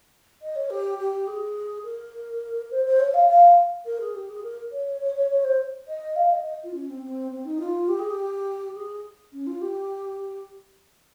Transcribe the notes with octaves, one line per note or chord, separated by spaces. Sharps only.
D#5
C#5
G4
G4
G#4
A#4
C5
C5
C#5
F5
F5
A#4
G#4
G4
G#4
A#4
C#5
C#5
C#5
C#5
C5
D#5
F5
D#5
D#5
F4
C#4
C4
C4
C4
D#4
F4
G4
G#4
G4
G#4
C#4
F4
G4